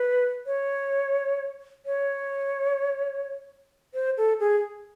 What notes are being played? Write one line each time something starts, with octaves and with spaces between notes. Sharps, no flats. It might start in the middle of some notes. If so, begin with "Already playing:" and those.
Already playing: B4
C#5
C#5
C5
A4
G#4